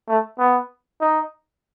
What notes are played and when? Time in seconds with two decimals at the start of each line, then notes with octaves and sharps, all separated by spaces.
0.09 A3
0.39 B3
1.01 D#4